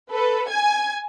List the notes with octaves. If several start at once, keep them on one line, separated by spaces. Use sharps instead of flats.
A4 B4
G#5 G#6